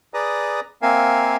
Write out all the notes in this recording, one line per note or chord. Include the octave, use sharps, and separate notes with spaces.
G#4 B4 D5 A#5 D#6
A#3 C4 A#4 E5 F5 G#5